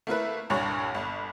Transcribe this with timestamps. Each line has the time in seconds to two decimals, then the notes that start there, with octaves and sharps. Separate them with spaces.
0.07 A3 A#3 E4 B4
0.50 C2 G2 A#2 D4 C#5
0.95 G1